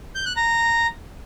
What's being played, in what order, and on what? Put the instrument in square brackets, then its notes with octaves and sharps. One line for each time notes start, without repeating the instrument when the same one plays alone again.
[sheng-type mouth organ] G6
F#6
A#5